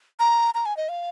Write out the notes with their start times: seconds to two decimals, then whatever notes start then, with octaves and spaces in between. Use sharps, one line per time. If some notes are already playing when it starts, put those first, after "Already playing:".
0.20 A#5
0.54 A#5
0.66 G#5
0.77 D#5
0.89 F5